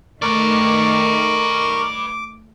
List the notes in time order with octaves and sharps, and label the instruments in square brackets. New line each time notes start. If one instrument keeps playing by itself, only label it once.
[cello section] D#3 A3 [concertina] A#4 C#6 [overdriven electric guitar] B4 D5 [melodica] D6